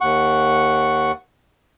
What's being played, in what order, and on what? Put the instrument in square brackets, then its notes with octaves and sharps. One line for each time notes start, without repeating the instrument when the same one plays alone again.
[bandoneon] D#2 F#5 C#6